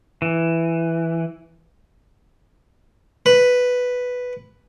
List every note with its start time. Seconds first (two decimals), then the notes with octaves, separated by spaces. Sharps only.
0.22 E3
3.26 B4